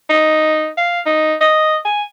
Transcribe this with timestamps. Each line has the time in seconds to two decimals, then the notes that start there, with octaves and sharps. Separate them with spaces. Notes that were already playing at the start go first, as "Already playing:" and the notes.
0.10 D#4
0.77 F5
1.06 D#4
1.41 D#5
1.85 G#5